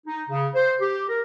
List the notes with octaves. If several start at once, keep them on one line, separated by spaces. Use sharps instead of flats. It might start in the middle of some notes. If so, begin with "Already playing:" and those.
D#4
C#3
C5
G4
A#4